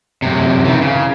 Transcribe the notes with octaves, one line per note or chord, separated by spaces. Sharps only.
F#2 C3
D#3 E3
C#3